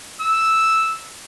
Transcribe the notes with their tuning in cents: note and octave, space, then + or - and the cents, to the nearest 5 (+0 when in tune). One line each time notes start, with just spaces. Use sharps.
E6 -5